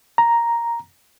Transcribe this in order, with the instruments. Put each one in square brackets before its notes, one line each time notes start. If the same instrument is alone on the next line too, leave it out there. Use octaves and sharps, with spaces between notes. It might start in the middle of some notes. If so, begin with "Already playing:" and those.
[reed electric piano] A#5